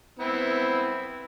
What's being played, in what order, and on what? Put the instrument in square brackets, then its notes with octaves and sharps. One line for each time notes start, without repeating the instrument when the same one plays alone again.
[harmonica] B3 C4 E4